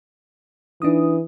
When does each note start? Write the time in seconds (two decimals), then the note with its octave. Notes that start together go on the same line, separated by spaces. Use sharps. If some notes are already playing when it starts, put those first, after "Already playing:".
0.82 E3 D4 D#4 D#6